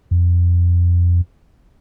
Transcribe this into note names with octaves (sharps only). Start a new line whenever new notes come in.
F2